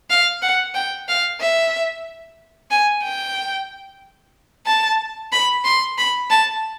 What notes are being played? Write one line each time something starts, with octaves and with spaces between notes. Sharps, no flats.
F5
F#5
G5
F5
E5
G#5
G5
A5
B5
C6
B5
A5